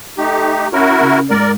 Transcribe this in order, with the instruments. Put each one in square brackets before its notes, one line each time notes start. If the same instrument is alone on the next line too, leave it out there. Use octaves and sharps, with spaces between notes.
[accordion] A3 D#4 G4
[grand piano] C#4 [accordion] E4 F#4 A#4
[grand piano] C#3
[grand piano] G#2 [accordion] A#4 D5